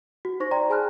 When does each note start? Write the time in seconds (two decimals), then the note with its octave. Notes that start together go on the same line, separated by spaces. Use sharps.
0.25 F#4
0.40 D#4 C5 C#6 A#6
0.51 D5 G5 A#5 C6
0.70 G#4 G#5 A5 B5 F6 F#6